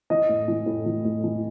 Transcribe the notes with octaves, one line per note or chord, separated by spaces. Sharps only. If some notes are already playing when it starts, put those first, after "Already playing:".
E3 D#5
A2
E3
A2
E3
A2
E3